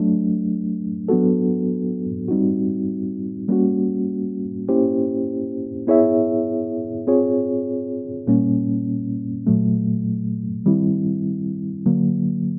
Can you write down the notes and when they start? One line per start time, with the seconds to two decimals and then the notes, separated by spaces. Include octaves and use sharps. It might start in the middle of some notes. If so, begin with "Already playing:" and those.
Already playing: F#3 A3 D4
1.09 F#3 B3 D4 F#4 A4
2.28 G3 C4 D#4 F#4
3.48 G3 A#3 C#4 F#4
4.68 A#3 C#4 E4 G4 C5
5.87 B3 E4 G#4 C#5 E5
7.07 C4 F4 G#4 C#5
8.27 A#2 G3 A#3 C#4
9.47 A#2 F#3 A3
10.66 D#3 G3 C4 E4
11.86 D3 F#3 A#3